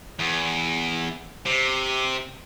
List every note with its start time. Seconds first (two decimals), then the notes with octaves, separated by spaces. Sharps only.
0.19 E2
1.46 C3